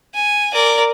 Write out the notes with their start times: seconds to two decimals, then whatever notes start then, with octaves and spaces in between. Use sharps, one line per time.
0.14 G#5
0.53 A#4 D5